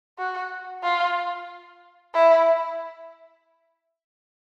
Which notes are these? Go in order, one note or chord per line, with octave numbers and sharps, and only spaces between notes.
F#4
F4
E4